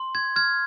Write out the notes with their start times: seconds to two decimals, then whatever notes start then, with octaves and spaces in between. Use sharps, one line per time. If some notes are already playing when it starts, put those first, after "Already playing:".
Already playing: C6
0.15 G#6
0.36 F6 G#6